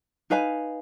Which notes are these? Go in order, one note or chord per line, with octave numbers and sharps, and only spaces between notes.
D#4 B4 F5 G#5